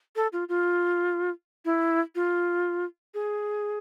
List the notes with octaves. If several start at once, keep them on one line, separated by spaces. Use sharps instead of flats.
A4
F4
F4
E4
F4
G#4